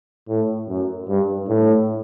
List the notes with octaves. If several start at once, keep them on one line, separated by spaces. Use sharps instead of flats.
A2
F#2
G2
A2